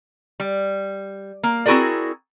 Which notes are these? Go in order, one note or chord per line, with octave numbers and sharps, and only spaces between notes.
G3
A#3
C4 E4 F#4 G#4 A#4 D5